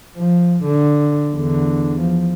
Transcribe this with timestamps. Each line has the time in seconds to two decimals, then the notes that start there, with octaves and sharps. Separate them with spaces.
0.17 F3
0.65 D3
1.35 E2 D3
2.01 F3